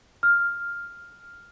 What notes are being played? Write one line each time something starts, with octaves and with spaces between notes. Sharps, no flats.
F6